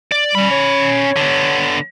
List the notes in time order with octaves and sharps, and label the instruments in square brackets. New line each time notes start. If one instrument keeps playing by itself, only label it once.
[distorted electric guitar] D5
[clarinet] G3 [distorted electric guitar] C#4 B5
[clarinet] C#5
[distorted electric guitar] D3 B3